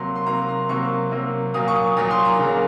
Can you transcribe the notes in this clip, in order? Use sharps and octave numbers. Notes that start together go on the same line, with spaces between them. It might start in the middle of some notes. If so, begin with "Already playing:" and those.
Already playing: C3 F#3 A#3 C6
C6
C3 F#3 A#3 A#5
C6
C3 F#3 A#3 C#6
C3 F#3 A#3
A#2 F#3 A#3 D#6
C#6
D#6
A#2 F#3 A#3 D#6
C6
A#5
C#3 F#3 A#3